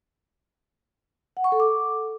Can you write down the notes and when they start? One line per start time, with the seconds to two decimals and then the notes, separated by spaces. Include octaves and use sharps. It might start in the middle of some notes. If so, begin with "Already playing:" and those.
1.37 F#5
1.44 C#6
1.52 A4
1.60 D6